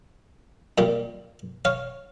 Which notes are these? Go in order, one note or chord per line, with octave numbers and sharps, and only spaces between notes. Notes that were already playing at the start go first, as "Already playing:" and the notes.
A#2 G3 A#3
C#5 F5